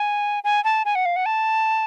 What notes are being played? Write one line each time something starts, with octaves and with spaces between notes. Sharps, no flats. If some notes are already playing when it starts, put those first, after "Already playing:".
Already playing: G#5
G#5
A5
G#5
F#5
F5
F#5
A5